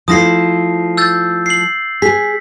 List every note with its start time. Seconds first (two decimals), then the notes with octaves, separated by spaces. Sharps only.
0.08 F3 A3 E4 D#6 A#6 C7
0.97 E6 G6 A6
1.46 C7 F#7
2.02 G#4 B6